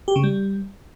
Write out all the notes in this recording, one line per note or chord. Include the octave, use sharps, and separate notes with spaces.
G4
C#3
G3